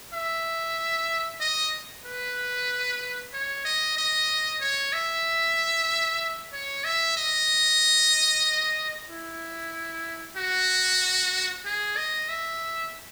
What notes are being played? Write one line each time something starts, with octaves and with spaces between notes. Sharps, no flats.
E5
D#5
B4
C#5
D#5
D#5
C#5
E5
C#5
E5
D#5
E4
F#4
G#4
D#5
E5